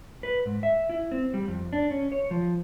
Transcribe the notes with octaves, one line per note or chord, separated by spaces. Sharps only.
B4
G#2
E5
E4
C4
G3
F2
D4
C#4
C#5
F3